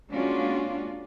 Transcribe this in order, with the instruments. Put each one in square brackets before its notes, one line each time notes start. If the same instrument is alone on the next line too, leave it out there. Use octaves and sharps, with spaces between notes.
[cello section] G#3 A#3 C#4 D4 F4 F#4